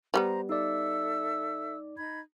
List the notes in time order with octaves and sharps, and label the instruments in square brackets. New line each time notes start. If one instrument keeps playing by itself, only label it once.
[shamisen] F3 G3 B3 [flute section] C5 A#5
[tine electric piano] D#4 D5 [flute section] A4 E5 E6
[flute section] D#4 B5 G#6